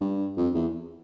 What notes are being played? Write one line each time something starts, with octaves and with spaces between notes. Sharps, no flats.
G2
F2
E2